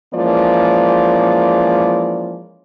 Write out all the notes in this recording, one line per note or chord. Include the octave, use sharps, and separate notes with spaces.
E3 F3 G#3 A#3 C#4 D5